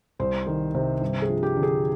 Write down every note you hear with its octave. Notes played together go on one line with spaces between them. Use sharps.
C2 C5
D#3
C3
G2
G#4
F3
G4
D3
G#4